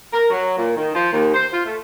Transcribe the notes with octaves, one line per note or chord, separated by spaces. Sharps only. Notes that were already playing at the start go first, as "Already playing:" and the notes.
A#4
F#3
A#2
D#3
F3
D#2
C5
F4
A3